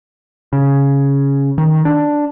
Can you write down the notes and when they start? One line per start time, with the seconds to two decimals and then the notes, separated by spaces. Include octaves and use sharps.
0.53 C#3
1.58 D#3
1.85 D4